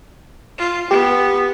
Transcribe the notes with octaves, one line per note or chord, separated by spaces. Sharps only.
F4
B3 G4